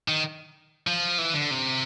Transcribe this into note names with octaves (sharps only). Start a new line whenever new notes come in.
D#3
F3
E3
D3
C3